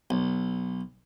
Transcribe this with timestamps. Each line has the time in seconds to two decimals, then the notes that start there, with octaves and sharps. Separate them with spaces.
0.10 B1